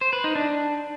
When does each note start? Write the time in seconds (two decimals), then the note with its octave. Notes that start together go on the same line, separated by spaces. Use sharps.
0.01 C5
0.13 B4
0.24 D#4
0.35 D4